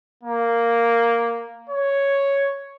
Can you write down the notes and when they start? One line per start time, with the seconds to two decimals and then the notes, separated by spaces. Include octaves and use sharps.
0.23 A#3
1.69 C#5